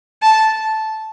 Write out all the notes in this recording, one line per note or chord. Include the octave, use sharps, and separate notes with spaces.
A5